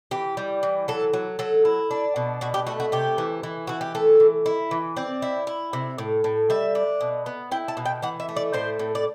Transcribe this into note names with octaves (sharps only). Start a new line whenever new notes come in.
E3 G4
G3
E3
F#3 A4
F#3
F#3 A4
E4
D4
B2
B2 F#4
G4
A3 F#4
F#4
C3 G4
E3
E3
E3 F#4
G4
A3 A4
E3
E4
E3
C4 D5
E4
E4
C3
A2
A2
G3 E5
D4
B2
B3
E4 G5
A5
B2
G5
E3 F#5
E5
A3
D5
A2 C5
A2
D5